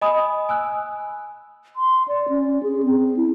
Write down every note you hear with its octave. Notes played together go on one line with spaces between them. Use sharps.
D#5 G#5 B5 D#6
G#5 E6 F#6
C6
D5
C#4
G#4
C4
E4